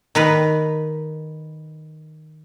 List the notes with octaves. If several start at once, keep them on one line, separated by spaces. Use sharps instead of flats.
D#3 A#4 B4